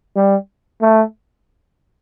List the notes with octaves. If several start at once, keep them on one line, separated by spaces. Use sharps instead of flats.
G3
A3